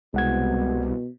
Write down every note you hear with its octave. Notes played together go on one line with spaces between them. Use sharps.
C2 B2 G#3 F#5 G#6